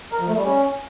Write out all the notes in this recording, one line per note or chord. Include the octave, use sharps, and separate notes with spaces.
A#4
F3
A3
G3
C#4